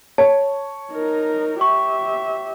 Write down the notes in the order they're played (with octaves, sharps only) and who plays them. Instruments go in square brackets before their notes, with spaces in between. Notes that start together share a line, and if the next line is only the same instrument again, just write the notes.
[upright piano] C#5 [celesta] A5
[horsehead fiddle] D#4 A#4
[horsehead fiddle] G4 E5 [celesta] C#6